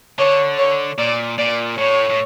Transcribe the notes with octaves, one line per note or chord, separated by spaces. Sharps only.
D3 C#5
C#5
A#2 D5
A#2 D5
A2 C#5
A2